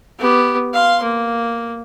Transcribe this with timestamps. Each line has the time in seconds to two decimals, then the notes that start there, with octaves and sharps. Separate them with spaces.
0.18 B3 G4
0.73 F5 C6
1.02 A#3